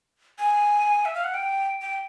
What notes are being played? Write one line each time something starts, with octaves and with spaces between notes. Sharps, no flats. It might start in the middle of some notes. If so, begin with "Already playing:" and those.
G#5
E5
F5
F#5
G5
G5